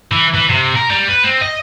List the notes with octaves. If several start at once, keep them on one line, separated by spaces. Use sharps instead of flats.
E3
E3
C3
A#4
G3
B4
C4
D#5